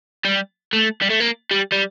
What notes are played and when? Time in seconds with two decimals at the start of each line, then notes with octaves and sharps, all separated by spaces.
0.25 G3
0.73 A3
1.02 G3
1.10 A3
1.20 A#3
1.51 G3
1.72 G3